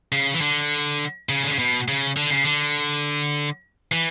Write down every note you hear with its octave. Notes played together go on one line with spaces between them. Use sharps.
C#3
E3
D3
C#3
D3
C#3
B2
C#3
D3
C#3
D3
E3